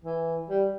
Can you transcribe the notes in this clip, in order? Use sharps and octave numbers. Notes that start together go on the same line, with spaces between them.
E3
G3